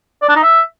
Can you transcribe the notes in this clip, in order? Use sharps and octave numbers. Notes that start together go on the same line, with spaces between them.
D5
D4
D#4
E5